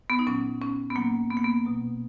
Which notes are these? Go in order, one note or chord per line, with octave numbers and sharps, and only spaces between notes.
B3
D#4
A#2 F#3 C#4
C#4
B3
A#2 F#3 A#3
B3
A#3
B3
B2 F#3